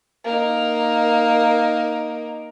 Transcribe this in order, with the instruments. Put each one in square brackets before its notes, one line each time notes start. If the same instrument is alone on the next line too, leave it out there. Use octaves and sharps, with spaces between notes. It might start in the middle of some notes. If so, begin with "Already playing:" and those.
[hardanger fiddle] A#3 D#4